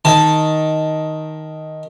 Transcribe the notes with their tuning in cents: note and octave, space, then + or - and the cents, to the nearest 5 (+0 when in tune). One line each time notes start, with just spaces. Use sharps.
D#3 +5 A5 +0